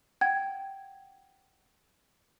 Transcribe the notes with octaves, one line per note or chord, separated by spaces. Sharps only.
F#5 G5 G#6